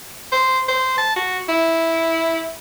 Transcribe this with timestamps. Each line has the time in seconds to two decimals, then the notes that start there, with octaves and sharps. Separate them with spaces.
0.32 C5
0.68 C5
0.98 A5
1.16 F#4
1.49 E4